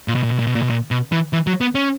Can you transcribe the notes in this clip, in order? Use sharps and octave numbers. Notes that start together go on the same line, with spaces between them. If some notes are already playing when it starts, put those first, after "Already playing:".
A#2
B2
A#2
B2
A#2
B2
A#2
B2
A#2
B2
E3
E3
F#3
B3
C#4